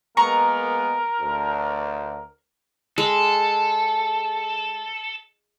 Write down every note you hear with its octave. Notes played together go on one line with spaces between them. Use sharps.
G#3 A#3 B3 A#4 A#5 C#6
D2
G#3 A4